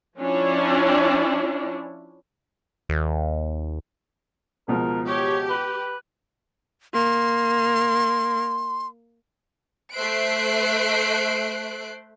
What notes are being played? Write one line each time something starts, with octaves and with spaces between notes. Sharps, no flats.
F3 C#4 D4 E4
D#2
C#2 B2 F3 A#4
G4 C#5
B4
A#3 C6
A3 C5 E5 F#6 C7 D7